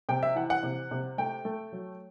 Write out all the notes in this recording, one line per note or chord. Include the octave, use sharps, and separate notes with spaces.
C3 G5
E5
E3 F#5
F#5
C3
C3
A3 G5
A3
F#3